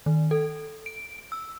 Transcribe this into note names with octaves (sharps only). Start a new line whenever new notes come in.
D#3
A4
D7
E6